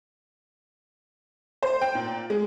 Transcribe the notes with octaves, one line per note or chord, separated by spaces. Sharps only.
C5
G5
A#2
G#3